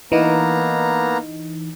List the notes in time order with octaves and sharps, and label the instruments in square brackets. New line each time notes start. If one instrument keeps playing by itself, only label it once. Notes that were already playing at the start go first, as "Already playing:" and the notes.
[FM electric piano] E3 D#4 [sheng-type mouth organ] A#3 B3 A#5